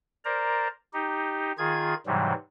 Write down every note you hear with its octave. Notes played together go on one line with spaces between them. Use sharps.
A#4 C5 D5 A#5
D#4 G4
D#3 F4 G#4 G#6
G#2 C3 E3 F#3 G3